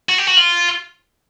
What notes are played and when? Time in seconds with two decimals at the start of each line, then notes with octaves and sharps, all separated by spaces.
0.09 F#4
0.18 G4
0.28 F#4
0.37 F4